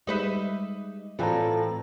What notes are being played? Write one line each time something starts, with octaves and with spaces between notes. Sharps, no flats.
G3 G#3 D#4 B4 E5
A2 E3 C4 F4 A4 B4 D5 A#5